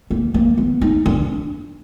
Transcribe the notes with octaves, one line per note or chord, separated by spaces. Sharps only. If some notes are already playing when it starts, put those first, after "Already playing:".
A#3
A#3
B3
D#4
D4